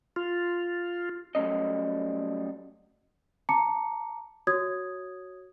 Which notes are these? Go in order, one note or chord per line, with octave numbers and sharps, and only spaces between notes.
F4
F#3 G3 A3 C#4 D#5
A5 A#5 D6 C#7
F#4 C#5 D#6 G#6